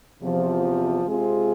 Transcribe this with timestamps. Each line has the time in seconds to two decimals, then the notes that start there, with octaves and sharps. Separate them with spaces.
0.23 E2 C3 F3
1.06 C3 G#3 C4 F4 G#4